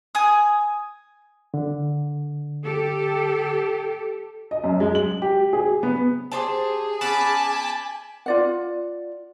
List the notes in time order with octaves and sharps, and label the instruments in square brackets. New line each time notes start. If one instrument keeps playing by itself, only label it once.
[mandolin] G#5 D#6
[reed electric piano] D3
[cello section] G4 A4
[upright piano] D#5
F#2
G#3
F#7
G4
G#4
B3
[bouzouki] G4 C5 A5 [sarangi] G#4
[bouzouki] B3 C#4 [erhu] G#5 [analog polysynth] A5 B5 D6
[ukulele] F4 D5 F#5